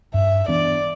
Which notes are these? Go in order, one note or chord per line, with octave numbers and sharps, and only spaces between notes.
G2 E5
E3 B3 D4 D5